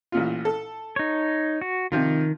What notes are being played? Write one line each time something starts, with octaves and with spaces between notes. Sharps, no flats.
A1 A#2 F4
A4
D#4 C#5
F#4
C3 D#3 F3 F4